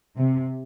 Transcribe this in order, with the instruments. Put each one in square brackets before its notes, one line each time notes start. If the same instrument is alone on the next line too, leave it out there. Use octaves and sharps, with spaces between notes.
[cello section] C3